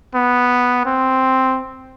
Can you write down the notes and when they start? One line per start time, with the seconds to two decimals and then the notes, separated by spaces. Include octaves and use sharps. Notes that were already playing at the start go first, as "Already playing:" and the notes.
0.15 B3
0.86 C4